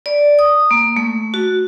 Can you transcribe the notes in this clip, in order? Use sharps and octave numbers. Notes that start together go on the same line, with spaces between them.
D5
D#6
A#3
A3
F#4